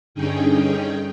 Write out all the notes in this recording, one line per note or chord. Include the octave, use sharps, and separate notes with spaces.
G2 D3 C#4 D#4 G#4 G5